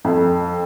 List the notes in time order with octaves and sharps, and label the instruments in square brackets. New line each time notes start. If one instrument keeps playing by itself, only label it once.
[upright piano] F2